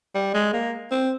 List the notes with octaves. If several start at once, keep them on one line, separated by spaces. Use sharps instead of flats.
G3
G#3
A#3
C4